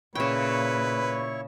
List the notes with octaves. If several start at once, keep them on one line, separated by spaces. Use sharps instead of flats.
A#2 C#3 E4 B4 C#5 G5 C#6